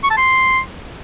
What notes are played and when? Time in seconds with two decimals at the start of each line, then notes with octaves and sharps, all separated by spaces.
0.04 C#6
0.10 A5
0.17 C6